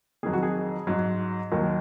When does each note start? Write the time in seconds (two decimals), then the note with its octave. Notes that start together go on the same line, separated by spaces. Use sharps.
0.23 F2 D#3 F#3 G#4
0.33 F#4
0.43 G#4
0.87 G#2 F#3
1.52 D#2 D#3 F#3